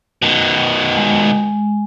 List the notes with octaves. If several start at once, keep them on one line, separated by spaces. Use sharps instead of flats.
B2 D#3
G#3